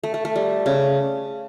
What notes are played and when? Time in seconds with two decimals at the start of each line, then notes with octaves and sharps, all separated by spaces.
0.04 A3
0.14 A3
0.25 A3
0.36 G3
0.66 C#3